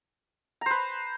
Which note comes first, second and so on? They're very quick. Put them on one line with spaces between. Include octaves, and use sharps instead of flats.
A#5 C5 B4